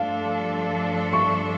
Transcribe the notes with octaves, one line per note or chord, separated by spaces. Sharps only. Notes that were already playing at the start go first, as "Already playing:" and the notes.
Already playing: G2 F3 A3 D4 A4 F5
C#6